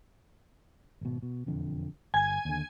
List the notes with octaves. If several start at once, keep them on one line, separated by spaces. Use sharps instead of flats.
G#1 B2
B2
E1 F2 D3
G1 G#5 G#6
D#2 D3